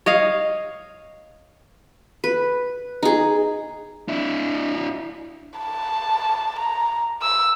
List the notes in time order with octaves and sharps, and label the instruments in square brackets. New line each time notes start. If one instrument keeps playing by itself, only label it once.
[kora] C#5 D#5 F5
[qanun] B4
D#4 G#4
[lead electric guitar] D4 E4
[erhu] A5
A#5
E6